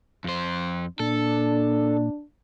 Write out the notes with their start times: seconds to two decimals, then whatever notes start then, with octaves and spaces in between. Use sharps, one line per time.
0.24 F2 C5
1.00 A#2 D4 A4